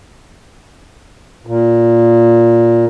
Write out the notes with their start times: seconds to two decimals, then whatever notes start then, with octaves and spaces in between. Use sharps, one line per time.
1.47 A#2